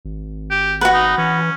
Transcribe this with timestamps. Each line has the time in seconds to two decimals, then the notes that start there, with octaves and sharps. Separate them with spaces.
0.05 G#1
0.50 G4
0.81 F#4 B4 F#5
0.94 D#4
1.18 E3 C#4